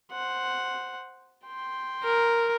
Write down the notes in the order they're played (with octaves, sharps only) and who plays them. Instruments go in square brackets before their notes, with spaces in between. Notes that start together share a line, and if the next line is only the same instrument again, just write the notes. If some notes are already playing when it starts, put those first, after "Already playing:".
[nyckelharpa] C5 F#5
G5 C6
[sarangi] A#4